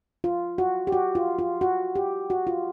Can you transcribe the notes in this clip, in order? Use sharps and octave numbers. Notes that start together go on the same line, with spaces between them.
F4
F#4
G4
F#4
F4
F4
F#4
G4
F#4
F4